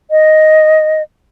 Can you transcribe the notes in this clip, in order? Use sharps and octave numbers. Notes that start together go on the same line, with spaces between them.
D#5